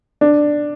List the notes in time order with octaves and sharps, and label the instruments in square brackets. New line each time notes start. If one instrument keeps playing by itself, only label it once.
[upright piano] D4